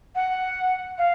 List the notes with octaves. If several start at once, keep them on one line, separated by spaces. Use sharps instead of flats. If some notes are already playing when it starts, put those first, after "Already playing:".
F#5
F5